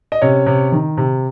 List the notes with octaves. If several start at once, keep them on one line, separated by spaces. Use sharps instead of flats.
D#5
C3 C#4 C#5
C3
D#3
C3